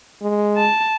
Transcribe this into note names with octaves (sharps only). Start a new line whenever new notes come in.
G#3
A5